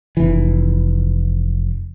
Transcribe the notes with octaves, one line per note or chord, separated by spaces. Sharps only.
F1 E3